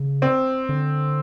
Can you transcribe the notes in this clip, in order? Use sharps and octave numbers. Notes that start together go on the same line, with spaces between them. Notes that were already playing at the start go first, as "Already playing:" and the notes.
Already playing: C#3
C4
D3